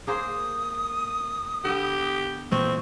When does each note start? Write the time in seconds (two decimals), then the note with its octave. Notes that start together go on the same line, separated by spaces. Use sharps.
0.07 A#3 G#4 C5 D#6
1.65 D3 B3 G4
2.52 A#2 E3 G#3 C4 C#6